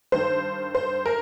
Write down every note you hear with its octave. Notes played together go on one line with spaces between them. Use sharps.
G2 D#3 C5
C5
A#4